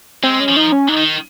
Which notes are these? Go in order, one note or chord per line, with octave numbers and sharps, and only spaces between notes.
G#3 C4
C#4
F3
D#4
C#4
D#4
D#3